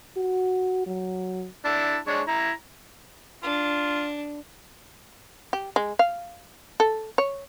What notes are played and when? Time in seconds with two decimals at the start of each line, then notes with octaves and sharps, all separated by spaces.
0.16 F#4
0.86 F#3
1.65 D4 E4 A5
2.07 G#3 D4 C#5
2.28 E4 A#5
3.43 D4 F4
5.53 G4
5.76 G#3
5.99 F5
6.80 A4
7.18 C#5